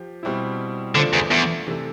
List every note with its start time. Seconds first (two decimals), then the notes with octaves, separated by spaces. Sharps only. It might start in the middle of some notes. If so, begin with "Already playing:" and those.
Already playing: F3 G4
0.23 B2 G3 C4 E4
0.94 D3 A3 D4 F4 C5
1.13 E2
1.31 E2
1.67 C3 E3 A3